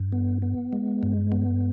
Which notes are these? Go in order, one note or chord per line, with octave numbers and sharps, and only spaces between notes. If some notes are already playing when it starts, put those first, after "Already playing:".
Already playing: G2
B3
B3
G#3
G2
B3